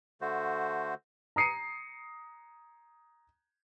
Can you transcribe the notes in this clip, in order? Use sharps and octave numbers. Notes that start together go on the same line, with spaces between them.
D3 A3 F#4 C5
A#5 D#6 C7 C#7 D#7